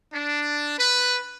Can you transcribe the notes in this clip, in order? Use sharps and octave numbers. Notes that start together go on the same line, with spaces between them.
D4
B4